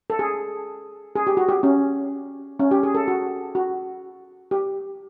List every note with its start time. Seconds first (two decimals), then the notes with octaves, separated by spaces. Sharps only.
0.10 A4
0.19 G#4
1.15 G#4
1.27 G4
1.37 F#4
1.49 G4
1.63 C#4
2.59 C#4
2.71 G4
2.83 G#4
2.95 A4
3.08 F#4
3.55 F#4
4.51 G4